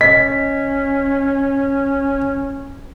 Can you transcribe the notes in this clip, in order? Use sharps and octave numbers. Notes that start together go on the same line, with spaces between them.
C#4 D#5 B6